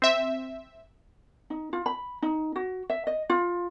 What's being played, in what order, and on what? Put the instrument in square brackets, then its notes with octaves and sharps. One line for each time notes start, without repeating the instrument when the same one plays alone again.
[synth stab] C4 E5
[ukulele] D#4
F4
B5
D#4
F#4
E5
D#5
F4